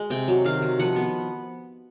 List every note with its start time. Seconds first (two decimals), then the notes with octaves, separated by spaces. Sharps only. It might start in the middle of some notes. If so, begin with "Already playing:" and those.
Already playing: G#3
0.10 C3 G5
0.28 F#3
0.45 D#3 F5
0.62 D#3
0.79 F3 F#5
0.96 B3